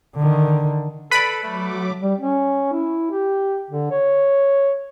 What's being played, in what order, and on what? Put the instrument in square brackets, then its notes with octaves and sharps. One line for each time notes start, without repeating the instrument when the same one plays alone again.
[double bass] D3 D#3
[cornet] A4 [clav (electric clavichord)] B4 D5 [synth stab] B5
[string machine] F#3 D6 [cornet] A3
[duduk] G3
C#4
E4
G4
D3
C#5